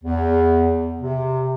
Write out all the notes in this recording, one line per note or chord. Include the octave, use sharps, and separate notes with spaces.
E2
C3